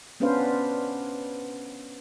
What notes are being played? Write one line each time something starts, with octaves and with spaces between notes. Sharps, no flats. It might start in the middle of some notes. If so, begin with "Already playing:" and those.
B3 C#4 D4 B4 C5 F5